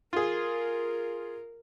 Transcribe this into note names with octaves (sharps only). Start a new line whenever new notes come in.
F4 G#4 A#4